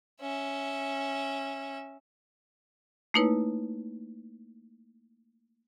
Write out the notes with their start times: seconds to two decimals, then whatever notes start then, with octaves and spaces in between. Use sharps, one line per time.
0.21 C#4 E5
3.14 A3 A#3 D#4 E4 B4 C#5